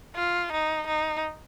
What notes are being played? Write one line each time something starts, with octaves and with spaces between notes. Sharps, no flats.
F4
D#4
D#4